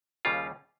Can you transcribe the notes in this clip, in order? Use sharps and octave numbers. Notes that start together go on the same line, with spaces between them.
D#2 C#3 G3 C#4 F4